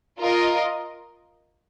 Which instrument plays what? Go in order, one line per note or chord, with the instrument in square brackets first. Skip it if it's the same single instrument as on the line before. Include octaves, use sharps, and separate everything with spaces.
[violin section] F4 A#4 D#5